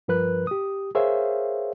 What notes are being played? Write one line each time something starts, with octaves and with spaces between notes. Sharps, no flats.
G2 F3 A#4 B4 F#6
G4 D#6
G#4 A#4 C5 C#5 E5 F5